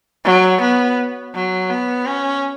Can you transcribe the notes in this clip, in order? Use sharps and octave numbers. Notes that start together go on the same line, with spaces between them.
F#3
B3
F#3
B3
C#4